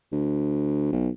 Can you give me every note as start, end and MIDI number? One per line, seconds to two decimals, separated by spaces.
0.12 0.89 38
0.92 1.09 35